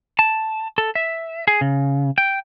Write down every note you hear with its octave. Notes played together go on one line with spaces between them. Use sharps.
A5
A4
E5
G#4
C#3
G5